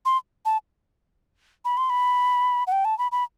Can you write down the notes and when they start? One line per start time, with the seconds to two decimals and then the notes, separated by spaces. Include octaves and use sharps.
0.05 C6
0.45 A5
1.65 B5
1.77 C6
1.90 B5
2.67 F#5
2.72 G5
2.85 A5
2.98 B5
3.12 B5